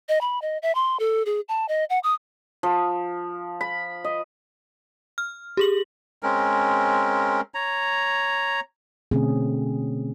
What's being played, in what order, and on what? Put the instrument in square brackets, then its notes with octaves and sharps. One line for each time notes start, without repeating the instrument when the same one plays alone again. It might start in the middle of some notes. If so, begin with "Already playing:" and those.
[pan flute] D#5
B5
D#5
E5
C6
A4
G#4
A5
D#5
F#5
D#6
[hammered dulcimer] F3
B5
D#5
[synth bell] F6
G4 G#4 F#7
[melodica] G#3 C4 C#4 A#4
C#5 A#5
[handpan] B2 D3 A3 C4 C#4 G#4